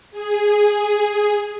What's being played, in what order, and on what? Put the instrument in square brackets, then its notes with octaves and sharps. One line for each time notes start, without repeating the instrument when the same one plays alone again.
[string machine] G#4